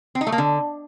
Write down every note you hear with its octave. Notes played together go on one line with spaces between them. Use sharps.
C4
D#4
A3
A#3
D3